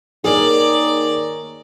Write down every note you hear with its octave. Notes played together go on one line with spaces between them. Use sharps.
D#3 A#3 G#4 A#4 C#5 D5